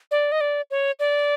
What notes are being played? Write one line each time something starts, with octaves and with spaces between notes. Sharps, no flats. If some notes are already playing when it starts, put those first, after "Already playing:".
D5
D#5
D5
C#5
D5